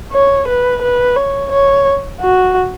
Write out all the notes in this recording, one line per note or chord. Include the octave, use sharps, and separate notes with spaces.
C#5
B4
B4
C#5
C#5
F#4